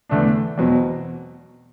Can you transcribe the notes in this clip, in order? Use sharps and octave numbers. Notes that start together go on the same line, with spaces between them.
E2 D3 A3 D4
E2 B2 F#3 C4